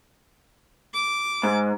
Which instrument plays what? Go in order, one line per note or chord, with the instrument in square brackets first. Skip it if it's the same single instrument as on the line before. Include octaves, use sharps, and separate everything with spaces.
[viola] D6
[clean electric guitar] G#2